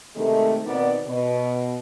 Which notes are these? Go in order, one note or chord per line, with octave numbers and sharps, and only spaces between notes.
C3 D#3 G#3 A3
B2 D#3 B3 C4 D5
B2